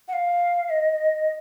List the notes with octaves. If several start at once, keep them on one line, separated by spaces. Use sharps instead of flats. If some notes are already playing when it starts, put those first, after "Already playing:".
F#5
F5
D#5